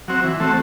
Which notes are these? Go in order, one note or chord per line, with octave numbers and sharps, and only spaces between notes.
F#3 C4 F#4
E3
A3 C4 F#4